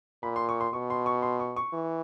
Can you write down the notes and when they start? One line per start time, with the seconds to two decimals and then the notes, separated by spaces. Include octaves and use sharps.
0.23 A#2 B5
0.36 C6
0.49 C#6
0.61 C6
0.73 B2 C#6
0.90 C6
1.06 C#6
1.23 C6
1.40 C#6
1.56 C#6
1.73 E3